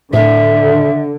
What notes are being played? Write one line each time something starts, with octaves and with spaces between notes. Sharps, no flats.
A2 D3 E5